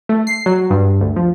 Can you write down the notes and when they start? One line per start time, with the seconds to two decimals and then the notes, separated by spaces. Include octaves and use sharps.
0.09 A3
0.27 C7
0.46 F#3
0.70 G2
1.01 D2
1.16 F3